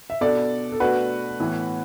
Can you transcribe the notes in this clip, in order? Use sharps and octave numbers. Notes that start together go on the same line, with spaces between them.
E5
B2 B3 D4 A4 D5
A4
B2 A3 D4 F#4 B4
A2 E3 B3